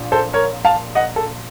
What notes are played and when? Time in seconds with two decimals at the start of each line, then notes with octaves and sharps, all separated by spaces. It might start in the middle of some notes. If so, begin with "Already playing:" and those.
Already playing: A#1 A#2
0.12 A4 C5
0.33 A#4 C#5
0.65 F5 A5
0.95 D#5 F#5
1.16 A4